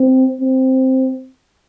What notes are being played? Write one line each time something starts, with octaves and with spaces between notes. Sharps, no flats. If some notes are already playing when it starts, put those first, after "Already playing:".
Already playing: C4
C4